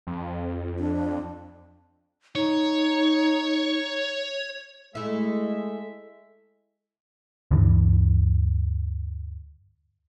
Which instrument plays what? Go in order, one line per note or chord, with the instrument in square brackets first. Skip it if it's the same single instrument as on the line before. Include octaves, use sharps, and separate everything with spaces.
[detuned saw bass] F2
[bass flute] D4
[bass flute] D#4 [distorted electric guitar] C#5
[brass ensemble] G#3 E5 [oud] A3 E4
[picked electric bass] D2 G2 D3 E3